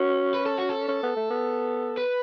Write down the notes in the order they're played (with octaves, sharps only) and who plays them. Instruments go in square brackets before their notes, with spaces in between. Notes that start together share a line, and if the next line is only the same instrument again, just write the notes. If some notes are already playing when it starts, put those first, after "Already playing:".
Already playing: [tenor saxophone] C#4 [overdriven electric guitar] F#4
[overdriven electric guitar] B4
A4
F#4
A4
[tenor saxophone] C#4
B3
A3
B3
[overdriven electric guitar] B4